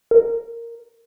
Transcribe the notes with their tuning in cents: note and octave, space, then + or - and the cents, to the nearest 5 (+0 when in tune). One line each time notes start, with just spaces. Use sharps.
A#4 -5